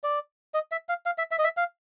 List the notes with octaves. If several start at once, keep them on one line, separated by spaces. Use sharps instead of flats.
D5
D#5
E5
F5
F5
E5
E5
D#5
E5
F5